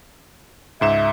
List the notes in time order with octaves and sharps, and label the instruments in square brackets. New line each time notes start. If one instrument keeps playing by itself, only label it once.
[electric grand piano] C#2 G#2 E7 [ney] E5